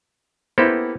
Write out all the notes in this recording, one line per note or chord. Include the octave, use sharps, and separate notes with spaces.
A#3 B3 E4 G4 A4 C5